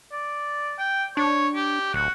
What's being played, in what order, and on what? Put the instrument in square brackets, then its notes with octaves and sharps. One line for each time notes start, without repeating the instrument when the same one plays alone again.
[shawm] D5
G5
[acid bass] D4 [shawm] C#5
[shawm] G4
[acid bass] D1 [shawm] F#4